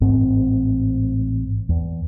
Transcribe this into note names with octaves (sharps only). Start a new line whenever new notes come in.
A1 G#2 C4
E2